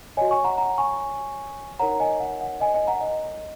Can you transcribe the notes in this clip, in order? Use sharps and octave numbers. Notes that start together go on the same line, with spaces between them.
F#4 C#5 D#5 G#5
G#5 C#6
F#5 A#5
F#5 A#5
G#5 C#6
D#4 A#4 C#5 F#5 A#5
D#5 G#5
F#5
F#5
D#5 G#5
D#5 G#5
F#5 A#5
D#5